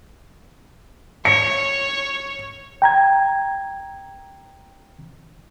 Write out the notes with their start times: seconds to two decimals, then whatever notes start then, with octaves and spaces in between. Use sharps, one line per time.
1.25 C#5 C#7
2.82 G5 A#5 G#6